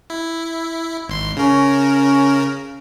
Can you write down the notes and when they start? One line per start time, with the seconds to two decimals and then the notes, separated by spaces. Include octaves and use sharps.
0.10 E4
1.08 G#1 C6
1.36 C#3 C#4 A#4